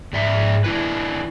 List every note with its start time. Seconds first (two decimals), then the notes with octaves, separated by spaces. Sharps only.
0.13 G#2 D5 E5 A#5
0.64 D4 E4 B4